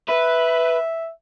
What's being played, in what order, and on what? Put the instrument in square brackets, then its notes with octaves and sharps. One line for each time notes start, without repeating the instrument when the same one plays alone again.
[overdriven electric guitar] B4 [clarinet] E5